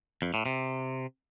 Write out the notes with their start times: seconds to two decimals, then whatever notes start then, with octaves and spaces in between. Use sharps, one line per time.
0.22 F2
0.34 A2
0.46 C3